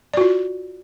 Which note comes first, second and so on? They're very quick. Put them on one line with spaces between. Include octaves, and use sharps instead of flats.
D5 F#4 F4